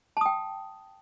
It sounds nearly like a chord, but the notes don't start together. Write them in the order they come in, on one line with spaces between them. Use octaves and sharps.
A5 D#6 G5